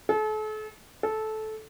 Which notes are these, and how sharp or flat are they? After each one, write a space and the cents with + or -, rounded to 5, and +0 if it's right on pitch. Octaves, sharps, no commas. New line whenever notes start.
A4 -40
A4 -15